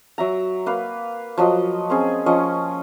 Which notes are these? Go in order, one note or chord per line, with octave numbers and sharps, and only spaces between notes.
F#3 E5 A#5
A#3 B4 F5
F3 F#3 D#5
C4 C#4 G#4
F3 C#4 D#5